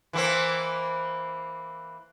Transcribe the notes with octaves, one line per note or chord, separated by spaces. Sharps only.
E3 A#3 C4